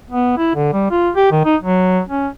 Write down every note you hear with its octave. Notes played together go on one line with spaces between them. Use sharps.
B3
E4
D3
G3
F4
G4
D#3
D#4
F#3
C#4